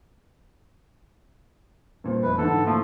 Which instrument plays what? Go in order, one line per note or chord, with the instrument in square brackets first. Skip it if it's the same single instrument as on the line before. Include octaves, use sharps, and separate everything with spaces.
[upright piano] G2 A#2 C4
[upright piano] F1 A#3 [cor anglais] B4
[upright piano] G#2 D3 E3 [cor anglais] A4
[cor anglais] F3 [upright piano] A3 A#3 E4